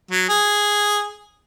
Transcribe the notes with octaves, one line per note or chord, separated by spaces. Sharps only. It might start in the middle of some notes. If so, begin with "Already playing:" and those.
F#3
G#4